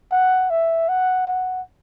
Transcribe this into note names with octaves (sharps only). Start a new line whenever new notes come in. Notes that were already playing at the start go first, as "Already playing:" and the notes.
F#5
E5
F#5
F#5